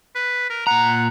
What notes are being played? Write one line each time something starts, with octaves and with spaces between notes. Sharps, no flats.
B4
A#4
A#2 F#5 A#5